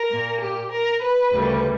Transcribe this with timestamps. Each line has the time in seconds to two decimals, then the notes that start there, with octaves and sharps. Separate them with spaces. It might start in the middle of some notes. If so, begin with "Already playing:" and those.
Already playing: A#4
0.11 A#2 A#3
0.40 G4
0.71 A#4
1.01 B4
1.32 D2 C#3 G3 A#3